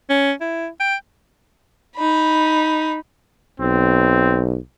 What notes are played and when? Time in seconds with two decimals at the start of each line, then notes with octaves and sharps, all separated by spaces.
0.10 C#4
0.41 E4
0.80 G5
1.96 D#4 B5
3.60 B1 C4